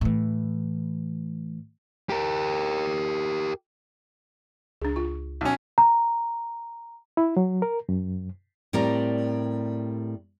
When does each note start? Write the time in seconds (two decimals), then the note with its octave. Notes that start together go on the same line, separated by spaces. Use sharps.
0.01 A2 E3
2.09 G4 A#4
4.82 C#2 D4 G#4
4.96 F4
5.41 B1 C#4
5.78 A#5
7.17 E4
7.37 F#3
7.62 A#4
7.89 F#2
8.73 A2 G3 C4 A#4 D5 A#5